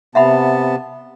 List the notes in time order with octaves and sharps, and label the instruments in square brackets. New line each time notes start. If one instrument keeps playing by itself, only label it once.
[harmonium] C3 B3 A5 [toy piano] E5 F#5 B5